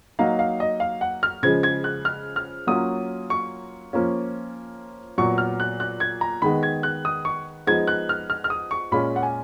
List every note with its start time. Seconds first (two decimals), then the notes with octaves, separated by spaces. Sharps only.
0.19 F#3 A#3 D#4 F5
0.39 F5
0.60 D#5
0.80 F5
1.01 F#5
1.23 F6
1.43 C#3 F3 G#3 G#6
1.63 G#6
1.84 F#6
2.05 F6
2.36 F6
2.67 F#3 A#3 C#4 F4 D#6
3.30 C#6
3.93 F3 A#3 C#4 F4
5.18 A#2 F#3 B3 C#6
5.38 F6
5.60 F#6
5.80 F#6
6.00 G#6
6.21 A#5
6.42 D#3 G#3 B3 D#4 B5
6.63 G#6
6.83 F#6
7.05 D#6
7.25 C#6
7.67 F3 G#3 B3 D#4 G#6
7.88 F#6
8.09 F6
8.30 F6
8.44 F6
8.50 D#6
8.71 C#6
8.92 A#2 G#3 C#4 F4 B5
9.16 F#5
9.23 G#5